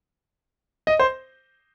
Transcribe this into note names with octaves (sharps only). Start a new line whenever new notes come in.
D#5
C5